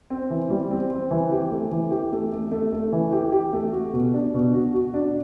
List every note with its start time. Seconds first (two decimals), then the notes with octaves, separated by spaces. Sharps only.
0.10 C4
0.30 E3
0.50 G3
0.71 C4
0.90 C4
1.11 E3
1.31 G4
1.51 A3
1.71 E3
1.91 G4
2.12 A3
2.32 A3
2.51 A3
2.72 A3
2.92 E3
3.12 G4
3.32 G4
3.53 A3
3.72 F#4
3.93 B2
4.14 D4
4.34 B2
4.53 F#4
4.74 F#4
4.94 D4